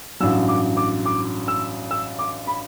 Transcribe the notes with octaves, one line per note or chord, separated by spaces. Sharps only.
A1 G2 F#3 E6
D6
D6
D6
E6
E6
D6
B5